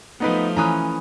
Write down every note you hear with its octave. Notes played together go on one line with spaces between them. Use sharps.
F3 A3 B3 D#4 B4
E3 C#4 B4 A#5 D#6